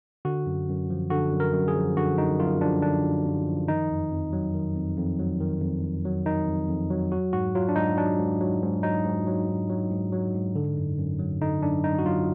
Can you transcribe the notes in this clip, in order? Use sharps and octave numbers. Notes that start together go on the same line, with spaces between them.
D3 F#4
F#2
F#2
F3
D3 F#4
F#2
A#4
F#2
G#4
F3
D3 F#4
F#2 D#4
F#2 F4
F3 D4
D3 D4
F#2
F#2
F3
D#3 D#4
F2
F2
F#3
D#3
F2
F2
F#3
D#3
F2
F2
F#3
D#3 D#4
F2
F2
F#3
F#3 F#4
G#2 F#4
F#3 F4
D4
G#2 D#4
F#3 D4
G#2
F#3
G#2
F#3 D#4
G#2
F#3
G#2
F#3
G#2
F#3
G#2
D3
F#2
F#2
F#3
D3 D#4
F#2 D4
F#2 D#4
F#4
F#3 F4